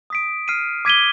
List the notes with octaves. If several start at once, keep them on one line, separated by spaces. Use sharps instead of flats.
D#6 B6 D7
F6 C7 D#7
D6 G#6 B6 D#7 G7